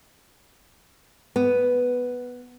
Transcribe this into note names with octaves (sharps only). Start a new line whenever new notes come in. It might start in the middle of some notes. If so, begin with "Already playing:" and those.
B3